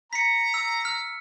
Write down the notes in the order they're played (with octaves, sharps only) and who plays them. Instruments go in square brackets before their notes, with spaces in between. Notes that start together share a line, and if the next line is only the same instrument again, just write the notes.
[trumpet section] A#5 [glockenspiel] B6 C#7
[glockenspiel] E6
F6